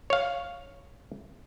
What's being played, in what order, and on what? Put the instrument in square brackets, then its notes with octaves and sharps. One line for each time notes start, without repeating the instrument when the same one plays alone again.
[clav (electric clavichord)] C#5 F5